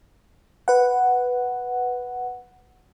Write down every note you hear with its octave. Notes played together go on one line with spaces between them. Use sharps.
B4 F#5